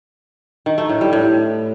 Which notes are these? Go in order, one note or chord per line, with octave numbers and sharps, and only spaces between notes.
D#3
A3
A2
G3
A2